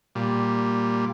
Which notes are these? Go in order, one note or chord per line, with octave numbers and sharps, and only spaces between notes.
A#2 G3